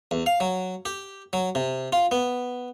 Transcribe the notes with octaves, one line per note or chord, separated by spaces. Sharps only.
E2
F5
F#3
G4
F#3
C3
F4
B3